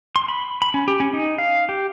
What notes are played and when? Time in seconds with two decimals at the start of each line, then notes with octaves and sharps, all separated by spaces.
0.16 C6
0.28 B5
0.62 B5
0.74 C#4
0.88 G4
1.00 C#4
1.13 D#4
1.38 F5
1.69 G4